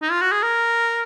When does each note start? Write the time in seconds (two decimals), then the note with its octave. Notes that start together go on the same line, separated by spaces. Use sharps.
0.02 D#4
0.11 F4
0.22 F#4
0.32 G#4
0.43 A#4